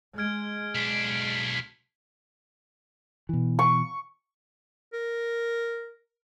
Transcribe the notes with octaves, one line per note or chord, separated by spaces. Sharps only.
G#3 F6 G#6 D7
B1 D4 B6
B2 E3
C#6
A#4